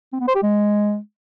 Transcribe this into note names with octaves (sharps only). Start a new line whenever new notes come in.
C4
B3
C5
G4
G#3